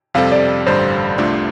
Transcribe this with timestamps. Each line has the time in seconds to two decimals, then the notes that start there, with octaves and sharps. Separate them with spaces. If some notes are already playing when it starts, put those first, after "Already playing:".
0.14 F2 C3 G3 C4 A4 F5
0.32 D5
0.66 A1 G2 D3 G3 C5
1.18 C2 C3 A3 D4 F4